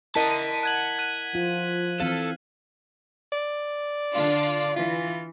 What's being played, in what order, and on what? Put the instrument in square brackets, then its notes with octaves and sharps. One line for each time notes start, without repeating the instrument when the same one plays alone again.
[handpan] E4 A#4 D#5 [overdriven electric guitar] F#5 A5 [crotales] B6 D#7
[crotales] F#6 G#6 F#7
F#6 G#6 D#7
[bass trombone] F3 [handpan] F4
[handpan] E3 C4 F5 [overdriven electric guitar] A4
[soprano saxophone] D5
[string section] D3 D4 F4
[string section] E3 [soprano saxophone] F4